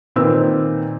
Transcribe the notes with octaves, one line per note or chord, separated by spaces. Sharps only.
A#2 D#3 C4 B4 E6